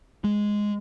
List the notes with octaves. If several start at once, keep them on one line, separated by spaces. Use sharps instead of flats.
G#3